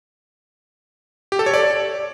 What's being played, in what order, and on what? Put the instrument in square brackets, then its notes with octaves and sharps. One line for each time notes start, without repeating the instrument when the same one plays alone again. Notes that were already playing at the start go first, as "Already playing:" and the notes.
[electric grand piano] G4
A4
C#5
D5